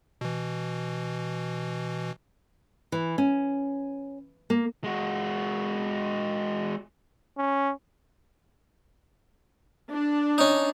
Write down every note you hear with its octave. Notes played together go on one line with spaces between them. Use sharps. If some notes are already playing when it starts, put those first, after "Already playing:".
B2 E3
E3
C#4
A#3
G#3 F#4
C#4
D4
C#4 D#4